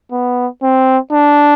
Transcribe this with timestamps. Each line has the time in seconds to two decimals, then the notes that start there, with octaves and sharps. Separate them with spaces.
0.12 B3
0.63 C4
1.13 D4